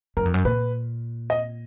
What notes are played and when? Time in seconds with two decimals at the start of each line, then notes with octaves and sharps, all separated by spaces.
0.17 F#2 A#4
0.25 F2
0.34 F#2
0.45 A#2 B4
1.30 D#5